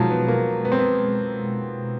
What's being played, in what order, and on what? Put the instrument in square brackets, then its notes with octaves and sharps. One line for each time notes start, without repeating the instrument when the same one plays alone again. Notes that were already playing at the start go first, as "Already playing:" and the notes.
Already playing: [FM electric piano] B2 G#3 [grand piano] D#3 F3 F#3
[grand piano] B3
A#3
B3
C4
B3